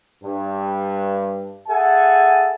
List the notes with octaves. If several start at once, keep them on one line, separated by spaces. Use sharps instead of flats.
G2
G#4 A4 E5 F#5 G#5